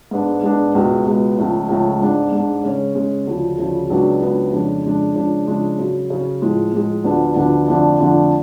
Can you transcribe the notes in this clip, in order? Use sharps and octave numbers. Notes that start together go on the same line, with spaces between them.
G#2 G#3 B3 D4
G#2 G#3 B3 D4
C#2 B2 G#3 B3
C#2 B2 G#3 B3
C#2 C#3 F3 A3
C#2 C#3 F3 A3
G#2 G#3 D4
G#2 G#3 D4
C#3 G#3 C#4
C#3 G#3 C#4
D2 C#3 F3
D2 C#3 F3
C#2 C#3 F#3 B3 D4
C#2 C#3 F#3 B3 D4
F2 C#3 G#3 D4
F2 C#3 G#3 D4
C#3 F3 G#3 D4
C#3 F3 G#3 D4
C#3 F#3 C#4
C#3 F#3 C#4
A2 F3 G#3
A2 F3 G#3
D2 D3 F3 B3 D4
D2 D3 F3 B3 D4
F2 D3 F3 A3 D4
F2 D3 F3 A3 D4